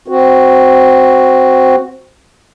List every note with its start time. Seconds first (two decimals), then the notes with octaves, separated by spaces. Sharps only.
0.08 C4 F#4